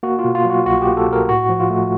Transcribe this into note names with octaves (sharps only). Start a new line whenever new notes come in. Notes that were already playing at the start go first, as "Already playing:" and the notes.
A#3 F#4
F4
B2
F4
F#3 F#4
C2 F#4
G4
A#3
A4
B2 A#4
A2 F#4
F3
F4
A3